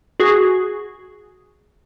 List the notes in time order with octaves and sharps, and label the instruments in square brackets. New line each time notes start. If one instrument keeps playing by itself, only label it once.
[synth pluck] F#4 G#4